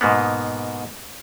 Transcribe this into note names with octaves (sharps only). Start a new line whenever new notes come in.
G#2 B2 A#3 B3